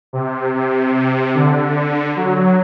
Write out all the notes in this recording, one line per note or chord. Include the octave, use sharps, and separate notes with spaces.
C3
C3
C3
D3
F#3